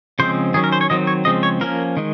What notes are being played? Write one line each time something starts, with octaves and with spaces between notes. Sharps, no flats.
C#3 F3 G#3 C4 C5
D#3 F#3 C#4 G#4
A#4
C5
C#5
D#3 F#3 C4 D#5
C#5
C#3 F3 G#3 C4 D#5
C#5
F3 A#3 C#4 A#4
D#3 G#3